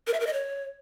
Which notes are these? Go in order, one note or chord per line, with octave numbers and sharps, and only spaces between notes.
A#4
E5
A#4
D#5
C#5